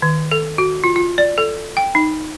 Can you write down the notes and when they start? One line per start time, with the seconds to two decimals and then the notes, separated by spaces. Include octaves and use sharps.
0.02 D#3
0.31 A4
0.58 F#4
0.84 F4
0.96 F4
1.18 D5
1.38 A4
1.77 G5
1.95 D#4